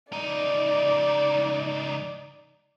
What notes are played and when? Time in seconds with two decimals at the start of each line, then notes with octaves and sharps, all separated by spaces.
0.13 C#2 D#4 D5